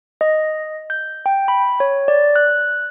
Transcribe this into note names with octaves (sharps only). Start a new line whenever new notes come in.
D#5
G6
G5
B5
C#5
D5
F#6